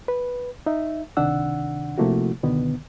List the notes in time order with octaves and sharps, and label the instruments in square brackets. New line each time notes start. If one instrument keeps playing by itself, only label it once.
[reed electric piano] B4
D#4 E5
C#2 C3 D#3 D4 F#5 E6
C3 F3 A3 A#3 E4 F#4
C#2 B2 D3 D#3 B3